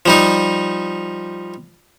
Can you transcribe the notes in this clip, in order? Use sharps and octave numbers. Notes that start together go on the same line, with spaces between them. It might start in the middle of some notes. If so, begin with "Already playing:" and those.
F3 G3 D#4